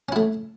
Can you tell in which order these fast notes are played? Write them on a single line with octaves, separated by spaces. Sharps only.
C#4 E4 A3